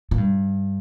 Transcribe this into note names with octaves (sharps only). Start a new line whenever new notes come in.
A#2
G2